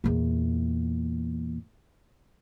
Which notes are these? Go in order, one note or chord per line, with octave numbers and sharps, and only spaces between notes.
E2 A#2